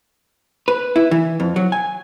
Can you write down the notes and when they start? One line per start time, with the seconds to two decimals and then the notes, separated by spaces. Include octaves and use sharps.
0.68 B4
0.96 E4
1.11 E3
1.40 F2
1.56 F#3
1.72 G#5